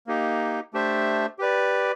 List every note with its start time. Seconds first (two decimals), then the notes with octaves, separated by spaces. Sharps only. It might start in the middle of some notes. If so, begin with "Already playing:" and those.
0.07 A#3 D#4 G4
0.73 A3 D4 G4 C5 E5
1.39 G4 B4 D5